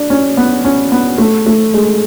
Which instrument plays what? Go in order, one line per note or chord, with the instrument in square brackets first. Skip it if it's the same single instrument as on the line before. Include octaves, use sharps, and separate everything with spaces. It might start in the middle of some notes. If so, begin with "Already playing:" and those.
Already playing: [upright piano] D4
C#4
B3
C#4
B3
A3
A3
G#3